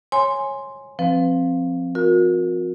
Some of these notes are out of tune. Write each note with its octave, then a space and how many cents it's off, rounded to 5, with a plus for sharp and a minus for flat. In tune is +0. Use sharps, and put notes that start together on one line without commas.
C#5 -20 G#5 +0 C6 +0
F3 +0 C4 +10 B4 +25
F#4 -45 A#4 +0